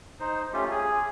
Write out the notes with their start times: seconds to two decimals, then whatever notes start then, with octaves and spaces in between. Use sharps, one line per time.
0.20 D#4 C5
0.53 A3 C#4 F4 G4
0.71 G#4